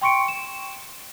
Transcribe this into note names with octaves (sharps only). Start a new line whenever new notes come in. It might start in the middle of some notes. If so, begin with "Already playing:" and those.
G5 C6 C#6 C#7 D7
E7